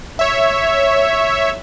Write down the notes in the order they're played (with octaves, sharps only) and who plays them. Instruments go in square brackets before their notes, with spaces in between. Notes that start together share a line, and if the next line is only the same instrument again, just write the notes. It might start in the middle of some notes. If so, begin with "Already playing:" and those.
[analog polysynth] C#5 E5